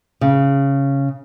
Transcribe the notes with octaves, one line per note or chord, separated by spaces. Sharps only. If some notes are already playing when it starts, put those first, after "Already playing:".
C#3